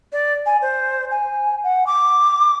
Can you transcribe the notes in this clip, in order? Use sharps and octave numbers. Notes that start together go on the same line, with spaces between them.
D5
G#5
C5
G#5
F#5
D6